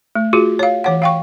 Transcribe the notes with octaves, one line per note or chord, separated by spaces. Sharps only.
A3
F4 F#4 G#4
C#5 F5
E3 C#5 F#5
F5 G5 C#6